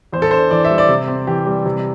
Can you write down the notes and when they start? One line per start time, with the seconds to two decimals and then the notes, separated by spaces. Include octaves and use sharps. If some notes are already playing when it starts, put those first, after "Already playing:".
0.12 E2 C5
0.22 A4
0.31 D4 C5
0.51 E3 D5
0.65 E5
0.70 G3
0.78 D5
0.88 C3
1.08 C4
1.27 E3 G4
1.46 G3
1.65 C3